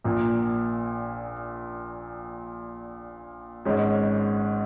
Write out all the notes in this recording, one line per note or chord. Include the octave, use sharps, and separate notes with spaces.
A#1 A#2 A#3
G#1 G#2 G#3 C#4